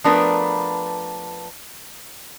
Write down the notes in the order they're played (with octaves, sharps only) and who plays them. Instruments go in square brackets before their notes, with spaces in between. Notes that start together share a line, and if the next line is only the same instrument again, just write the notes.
[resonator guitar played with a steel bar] F3 A3 B3 D4 A#4 B4